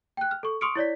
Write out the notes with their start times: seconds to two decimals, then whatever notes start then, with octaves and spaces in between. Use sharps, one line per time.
0.17 G5 F#6
0.31 F6
0.43 A4 C#6
0.61 C6 C#6 D#6 F6 C#7 D7
0.76 E4 C#5 D5 B6